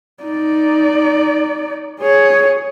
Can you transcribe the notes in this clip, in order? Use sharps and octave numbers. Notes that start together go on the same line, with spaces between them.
D#4 D5
G#4 C#5